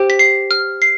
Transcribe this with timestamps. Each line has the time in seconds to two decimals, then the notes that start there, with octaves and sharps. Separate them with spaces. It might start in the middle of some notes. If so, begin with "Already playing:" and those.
Already playing: G4 C5 G5
0.10 B6
0.19 C7
0.51 F6
0.82 C7